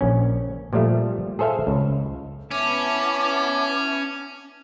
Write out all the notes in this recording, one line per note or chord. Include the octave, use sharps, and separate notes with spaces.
A#1 C#4
A#2 F3 G3 A3
G#4 A4 C5 E5 F5
C#2
B3 C#4 E4 A5 D6